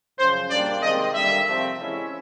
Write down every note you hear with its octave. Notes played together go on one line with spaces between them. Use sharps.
F#2 C#3 F3 C5
A#2 G3 A#3 D4 D5
C3 D#3 G#3 C4 D#5
D3 G3 A#3 E5
C3 F3 A3 C4
E3 G#3 C#4 E4